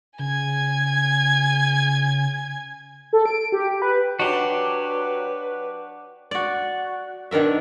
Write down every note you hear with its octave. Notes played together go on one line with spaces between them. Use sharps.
C#3 G#5 G#6
A4
D7
G4
B4
F#3 D4 F#4 G4 B4
F#4 D5
B2 D#3 D4 A#4 E5